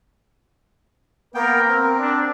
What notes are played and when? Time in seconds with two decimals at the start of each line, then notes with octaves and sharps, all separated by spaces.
1.35 A#3 B3 A#4 G5
1.68 C4
1.98 D4